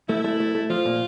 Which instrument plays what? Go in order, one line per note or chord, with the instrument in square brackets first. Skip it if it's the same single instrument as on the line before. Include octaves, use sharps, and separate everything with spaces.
[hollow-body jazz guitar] A3 [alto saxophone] E4
[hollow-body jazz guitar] A3
A3
A3
[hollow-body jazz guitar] F3 [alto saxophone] F4
[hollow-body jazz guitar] A#2